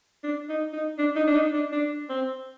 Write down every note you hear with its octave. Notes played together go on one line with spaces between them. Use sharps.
D4
D#4
D#4
D4
D#4
D4
D#4
D4
D4
C4